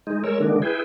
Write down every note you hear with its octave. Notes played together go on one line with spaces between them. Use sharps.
G#3 D#4
G#3 A#4 C#5 E6
D3 D#3 G#3 A#3 D4
E4 G#4 B4 G5